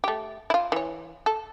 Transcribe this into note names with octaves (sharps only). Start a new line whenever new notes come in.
A3 G4
E4 F4
E3 C#5
A4